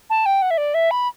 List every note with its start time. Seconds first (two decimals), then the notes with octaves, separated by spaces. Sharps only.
0.10 A5
0.26 G5
0.42 F#5
0.51 E5
0.58 D5
0.74 E5
0.91 B5